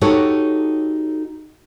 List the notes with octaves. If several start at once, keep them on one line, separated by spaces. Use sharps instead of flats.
D#4 F#4 G4 A4 C#5